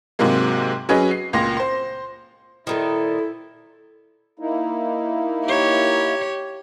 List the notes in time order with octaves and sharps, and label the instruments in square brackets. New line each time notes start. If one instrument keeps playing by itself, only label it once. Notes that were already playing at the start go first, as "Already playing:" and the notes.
[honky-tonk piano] G#2 C3 F#3 G#3 A#3
F#3 C#4 G#4 B4 D#5
C7
C#2 A#2 C6 A#6
C5 C6
[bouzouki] A#2 D#3 [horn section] E4 [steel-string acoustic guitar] A4 C5
[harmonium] A#3 D#4 E4
[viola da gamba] G4 C#5